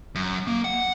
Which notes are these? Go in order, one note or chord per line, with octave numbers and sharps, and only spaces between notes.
F#2
A#3
F#5